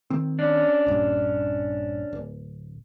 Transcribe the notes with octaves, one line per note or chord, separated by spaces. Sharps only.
D#3 C4
C#4 D4
A#1 G2
D1